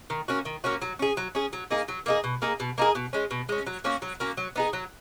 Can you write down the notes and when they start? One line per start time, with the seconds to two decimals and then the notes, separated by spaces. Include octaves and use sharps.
0.10 D#3
0.28 A#3 C#4 F#4
0.45 D#3
0.64 A#3 C#4 F#4
0.82 F#3
0.99 C#4 G#4
1.17 F#3
1.35 C#4 G#4
1.53 F#3
1.71 A#3 D#4 G#4
1.88 F#3
2.06 A#3 D#4 G#4
2.24 B2
2.42 A#3 D#4 G#4
2.60 B2
2.78 A#3 D#4 G#4
2.95 B2
3.13 G#3 C#4
3.31 B2
3.49 G#3 C#4
3.67 F#3
3.84 A#3 C#4 F#4
4.02 F#3
4.20 A#3 C#4 F#4
4.37 F#3
4.56 B3 D#4 G#4
4.73 F#3